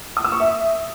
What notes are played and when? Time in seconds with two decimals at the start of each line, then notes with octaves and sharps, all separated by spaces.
0.17 D#6
0.24 E6
0.32 C#6
0.40 E5